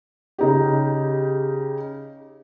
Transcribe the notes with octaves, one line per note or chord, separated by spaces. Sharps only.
C#3 D#4 G4